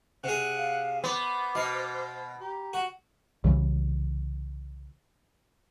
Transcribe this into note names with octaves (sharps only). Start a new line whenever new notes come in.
C3 G#4 F#5
F5
B3 C5 D6
B2 F5
G4 A#5
F#4
C2 C#3 E3